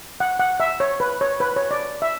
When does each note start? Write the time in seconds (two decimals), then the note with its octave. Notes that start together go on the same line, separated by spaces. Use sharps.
0.20 F#5
0.40 F#5
0.60 E5
0.80 C#5
1.00 B4
1.21 C#5
1.40 B4
1.56 C#5
1.71 D5
2.02 E5